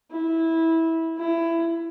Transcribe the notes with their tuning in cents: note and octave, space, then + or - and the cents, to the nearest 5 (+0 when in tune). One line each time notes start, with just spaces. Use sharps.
E4 -15
E4 +15